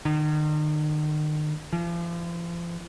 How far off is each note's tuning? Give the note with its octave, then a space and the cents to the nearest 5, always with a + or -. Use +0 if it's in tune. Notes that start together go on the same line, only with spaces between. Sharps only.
D#3 -40
F3 -40